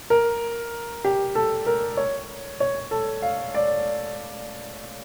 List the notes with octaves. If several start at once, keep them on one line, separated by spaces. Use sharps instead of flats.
A#4
G4
A4
A#4
C#5
C#5
A4
F5
D5